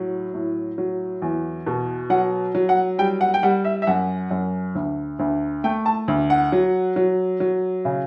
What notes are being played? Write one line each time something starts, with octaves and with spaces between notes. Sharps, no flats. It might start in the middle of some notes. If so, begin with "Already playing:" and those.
Already playing: A2 F#3
A2
F#3
E2
B2
F#3 F#5
F#3
F#5
G3 G5
F#5
G5
G3 F#5
E5
E5
F#2 F#5
F#2
D2
D2
A3 G5
A5
D2
F#5
F#3
F#3
F#3
C#3